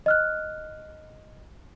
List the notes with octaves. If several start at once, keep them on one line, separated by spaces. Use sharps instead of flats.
D#5 F6 F#6